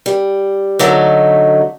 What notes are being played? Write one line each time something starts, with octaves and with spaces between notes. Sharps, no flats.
G3
D3 F#3 A3 D#4